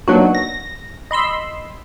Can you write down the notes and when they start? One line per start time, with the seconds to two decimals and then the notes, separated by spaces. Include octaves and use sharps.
0.08 F#3 A#3 B3 D4 D#4 F#4
0.35 A#6
1.11 D#5 B5 C6 E6